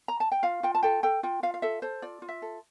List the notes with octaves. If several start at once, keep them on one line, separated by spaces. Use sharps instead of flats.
A#5
A5
G5
F4 F5
F4 G5
A5
A4 G5
A4 G5
F4 G5
F4 F5
F5
A4 E5
A4 C5
F4 D5
F4
E5
A4